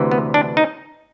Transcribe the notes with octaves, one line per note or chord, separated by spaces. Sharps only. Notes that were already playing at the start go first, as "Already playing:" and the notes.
Already playing: D2 C3 E3
B3
D4
D#4